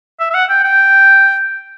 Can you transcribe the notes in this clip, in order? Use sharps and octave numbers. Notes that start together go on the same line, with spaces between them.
E5
E5
F#5
G5
G5